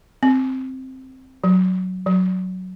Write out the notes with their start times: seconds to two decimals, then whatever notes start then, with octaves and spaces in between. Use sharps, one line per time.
0.23 C4
1.44 F#3
2.07 F#3